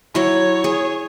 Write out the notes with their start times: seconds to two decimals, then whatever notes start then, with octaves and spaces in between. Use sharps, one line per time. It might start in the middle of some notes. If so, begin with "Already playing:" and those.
0.15 F#3 E4 C#5
0.64 G#4